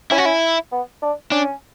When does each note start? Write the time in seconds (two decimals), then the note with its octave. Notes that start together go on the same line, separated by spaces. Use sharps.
0.11 C#4 E4
0.18 F#4
0.25 E4
0.72 B3
1.02 D4
1.32 C#4 D4